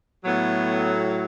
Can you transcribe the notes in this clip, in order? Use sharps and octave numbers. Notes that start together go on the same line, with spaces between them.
A2 F#3 B3